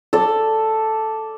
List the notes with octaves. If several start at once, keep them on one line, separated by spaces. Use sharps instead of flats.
A4 D5